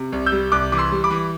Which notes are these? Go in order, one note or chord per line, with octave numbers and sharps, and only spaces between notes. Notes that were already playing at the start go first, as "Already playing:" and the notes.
Already playing: C3
C2
E6 G6
G3
C2 D6 F#6
E3 D6
C6 E6
G3
B5 D6
E3